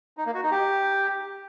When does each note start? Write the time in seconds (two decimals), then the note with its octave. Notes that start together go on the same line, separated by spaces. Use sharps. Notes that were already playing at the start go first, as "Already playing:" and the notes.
0.17 D#4
0.26 A#3
0.34 F#4
0.43 D#4
0.51 G4